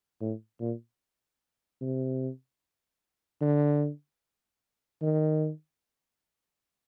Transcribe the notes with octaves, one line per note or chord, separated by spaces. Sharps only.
A2
A#2
C3
D3
D#3